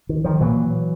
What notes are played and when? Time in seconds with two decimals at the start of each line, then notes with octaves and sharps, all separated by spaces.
0.09 D#3
0.24 D#3 F3
0.40 A#2 E3 F#3